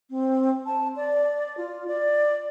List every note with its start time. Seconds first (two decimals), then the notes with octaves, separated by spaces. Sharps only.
0.10 C4
0.66 A5
0.96 D5
1.57 F4
1.88 D5